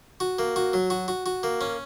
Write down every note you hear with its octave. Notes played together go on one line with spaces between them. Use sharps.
F#4
A#3
F#4
F#3
F#4
F#4
F#4
A#3
C#4